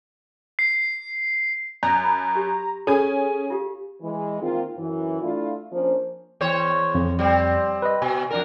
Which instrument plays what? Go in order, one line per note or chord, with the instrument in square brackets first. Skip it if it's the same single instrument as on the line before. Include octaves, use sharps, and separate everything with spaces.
[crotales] C7
[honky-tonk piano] F#2 [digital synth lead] A#5
[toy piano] B5
G4
[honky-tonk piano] C#4 G#5 [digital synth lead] G#4 [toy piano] A4
[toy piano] F4 G4 F5
[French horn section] E3 G#3
D#3 A#3 C4 F4
F#2 E3
A3 D4 E4 F4
F3 A#3 C#4 D4 A#4 C5
[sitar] E2 C5 C#5
[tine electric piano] F2
[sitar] G3 C4
[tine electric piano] B4 D#5
[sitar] B2 [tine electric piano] G#5
[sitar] F2 D4 A#4